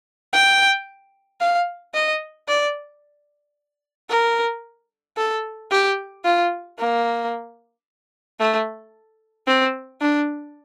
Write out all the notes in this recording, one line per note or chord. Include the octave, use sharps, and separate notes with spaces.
G5
F5
D#5
D5
A#4
A4
G4
F4
A#3
A3
C4
D4